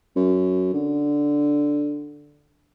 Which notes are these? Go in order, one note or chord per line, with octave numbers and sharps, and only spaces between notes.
F#2
D3